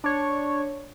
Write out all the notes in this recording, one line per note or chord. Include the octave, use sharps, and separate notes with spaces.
D4 C#5